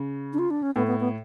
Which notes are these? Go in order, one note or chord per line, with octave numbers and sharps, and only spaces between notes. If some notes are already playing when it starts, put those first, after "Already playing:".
Already playing: C#3
D4
F4
D4
C#4
A2 B3
B3
B3